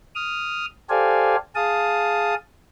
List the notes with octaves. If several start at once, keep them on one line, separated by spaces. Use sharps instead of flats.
D#6 F6
G4 A4 C5 D5 F5 G#5
G#4 F5 A5 D#6